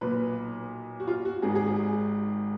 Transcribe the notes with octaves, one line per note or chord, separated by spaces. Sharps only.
B1 A#2 B4
F#4
F4
F#4
G#1 G#2 D#3 G#4
G#4
G#4